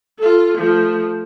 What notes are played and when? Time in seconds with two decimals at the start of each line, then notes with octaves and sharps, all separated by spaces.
0.18 F4 A4
0.58 F3 A3